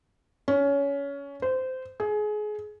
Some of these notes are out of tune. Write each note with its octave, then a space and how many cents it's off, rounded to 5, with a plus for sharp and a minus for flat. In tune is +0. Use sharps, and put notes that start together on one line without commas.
C#4 +20
C5 -20
G#4 +25